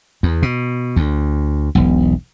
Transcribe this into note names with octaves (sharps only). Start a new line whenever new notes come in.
E2
B2
D2
E1 B1